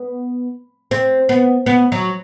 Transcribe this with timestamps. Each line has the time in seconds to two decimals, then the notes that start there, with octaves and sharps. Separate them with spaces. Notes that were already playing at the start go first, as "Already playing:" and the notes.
Already playing: B3
0.91 C4
1.29 B3
1.66 B3
1.92 F#3